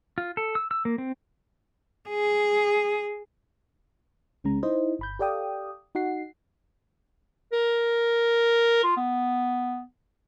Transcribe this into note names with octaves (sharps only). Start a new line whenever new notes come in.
F4
A4
E6
E6
A#3
C4
G#4
C2 C#3 G#3 C#4 A#5
D#4 E4 C5 D#5
G1 B5 G6
G4 A4 D5 F5 G5 D#6
D#4 F#4 F#5 C7
A#4
F4
B3